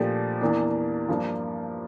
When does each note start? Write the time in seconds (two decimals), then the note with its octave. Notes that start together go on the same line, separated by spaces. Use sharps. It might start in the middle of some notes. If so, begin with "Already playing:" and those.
Already playing: A#2 F3 A3 D4 G4
0.41 E2 E3 A#3 D4
1.09 G2 F3 A#3 D4